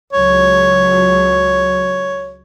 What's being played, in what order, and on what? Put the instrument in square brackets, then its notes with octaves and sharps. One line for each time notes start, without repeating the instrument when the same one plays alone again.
[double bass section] C#2 F#3 [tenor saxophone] C#5